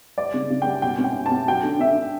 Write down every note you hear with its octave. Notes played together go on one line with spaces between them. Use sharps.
G3 D5
C#3
C#3
G5
G3
B2 G5
C#4
G5
B2
A5
C#4
F#3 G5
D3
D3 E5
D3